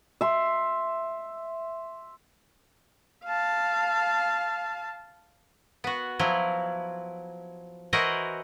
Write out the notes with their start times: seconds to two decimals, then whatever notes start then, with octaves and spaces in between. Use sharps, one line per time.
0.21 E5 C6
3.25 F5 A5
5.84 B3 F#4
6.19 F3 F#3 E4
7.93 E3 E4 F#4 A#4 C5 D#5